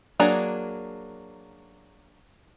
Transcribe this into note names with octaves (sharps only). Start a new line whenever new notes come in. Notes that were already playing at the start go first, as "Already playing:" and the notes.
F#3 A#3 D4 G#4 A#5